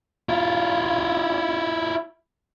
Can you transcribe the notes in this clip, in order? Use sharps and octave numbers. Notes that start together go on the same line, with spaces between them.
E4 F4